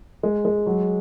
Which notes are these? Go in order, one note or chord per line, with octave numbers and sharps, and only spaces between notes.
G#3
G#3
F#3